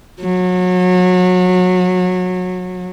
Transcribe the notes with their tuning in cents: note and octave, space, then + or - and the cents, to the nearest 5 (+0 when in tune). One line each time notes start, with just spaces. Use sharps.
F#3 -25